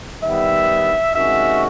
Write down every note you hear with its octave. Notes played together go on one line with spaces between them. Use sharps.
D#3 G3 B3 E5
C3 D#3 G#3 C#4 F#4 E5